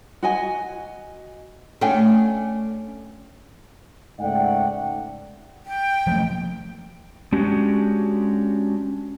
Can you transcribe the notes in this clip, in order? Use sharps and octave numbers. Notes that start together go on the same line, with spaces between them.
F#4 D#5 G#5
A3 C#4 D4 G5 G#5
C#2 G#2 A3 D5 F#5 G5
G5
F3 A3 A#3
G#3 C#4 D4 F#4 G4